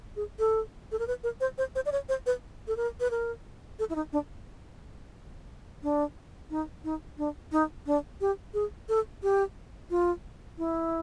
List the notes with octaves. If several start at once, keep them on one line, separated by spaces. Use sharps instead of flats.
G#4
A4
A4
A#4
B4
A#4
C5
C5
C5
D5
C#5
C5
B4
A4
A#4
B4
A#4
A4
E4
D#4
D4
D4
D#4
D#4
D4
D#4
D4
G4
G#4
A4
G4
F4
E4